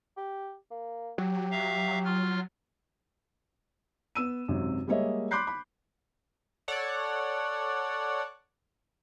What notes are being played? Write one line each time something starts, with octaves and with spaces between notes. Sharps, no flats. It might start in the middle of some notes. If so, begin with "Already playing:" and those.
G4
A#3
F#3 G4
E5 F5 A#5
F4 F6
B3 E6 D#7
G#1 F#2 C3
G3 G#3 A#3 C#5 D#5 E5
B5 C6 D6 F#6 G6 C7
B5
A4 C#5 D5 F#5